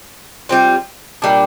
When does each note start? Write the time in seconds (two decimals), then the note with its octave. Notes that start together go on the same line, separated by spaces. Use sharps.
0.49 G3 C4 F4
1.22 A#2 G3 D4